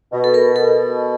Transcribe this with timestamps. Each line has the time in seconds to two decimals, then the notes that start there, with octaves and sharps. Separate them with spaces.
0.12 B2
0.24 A4
0.34 A#4
0.56 B2 A4